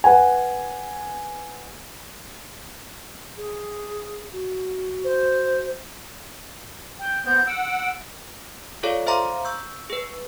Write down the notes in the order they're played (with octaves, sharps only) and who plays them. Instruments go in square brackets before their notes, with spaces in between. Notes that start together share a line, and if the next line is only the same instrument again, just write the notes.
[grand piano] B4 F#5 G#5
[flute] G#4
F#4
[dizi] C5
[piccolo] G5
[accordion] B3 C4 [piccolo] G6
[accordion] F#5 E6 [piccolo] D7
[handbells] F4 G#4 A4 C#5 D5 F5
C5 E5 F5 A#5 C6 D6
C#6 E6 G6
G#4 B4